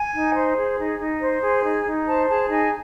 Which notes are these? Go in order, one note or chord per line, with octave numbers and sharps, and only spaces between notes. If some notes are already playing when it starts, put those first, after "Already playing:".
Already playing: G#5
D#4
C5
G#4
D#4
D#4
C5
G#4
D#4
D#4
C5 A5
G#4 A5
D#4 G#5